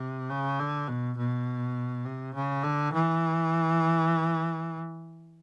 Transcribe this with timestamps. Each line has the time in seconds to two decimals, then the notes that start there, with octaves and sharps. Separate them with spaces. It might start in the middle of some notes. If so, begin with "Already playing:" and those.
Already playing: C3
0.30 C#3
0.59 D3
0.88 B2
1.17 B2
2.05 C3
2.35 C#3
2.63 D3
2.93 E3